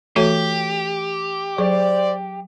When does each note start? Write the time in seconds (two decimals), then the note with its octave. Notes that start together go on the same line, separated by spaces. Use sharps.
0.16 E3 A3 F#4 G4 A4 C#5
1.58 F#3 G#4 C5 D5